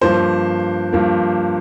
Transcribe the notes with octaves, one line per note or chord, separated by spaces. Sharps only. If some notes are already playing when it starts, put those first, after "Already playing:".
G2 F3 A#3 C5
G2 F3 A#3